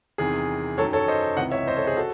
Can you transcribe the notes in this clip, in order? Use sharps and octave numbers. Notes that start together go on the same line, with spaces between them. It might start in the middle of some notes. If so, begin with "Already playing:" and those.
E2 C3 D#3 G#4
F#2 D#3 F#3 A4 C#5
A4 C#5
C5 D#5
C#2 C3 E3 D#5 F#5
C#5 E5
C5 D#5
A4 C#5
G#4 C5
F#4 A4